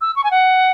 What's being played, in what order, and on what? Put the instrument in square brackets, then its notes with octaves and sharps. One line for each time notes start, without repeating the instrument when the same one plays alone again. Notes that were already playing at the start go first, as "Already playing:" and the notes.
[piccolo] E6
C#6
G#5
F#5